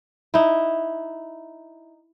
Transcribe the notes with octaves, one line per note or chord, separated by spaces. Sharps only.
D#4 E4